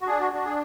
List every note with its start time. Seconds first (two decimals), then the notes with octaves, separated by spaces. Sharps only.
0.01 F#4
0.07 D4 G#4
0.19 F#4
0.33 D4 F#4
0.45 G#4